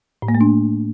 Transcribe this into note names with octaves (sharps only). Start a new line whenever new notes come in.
A2
A#3
A3
D4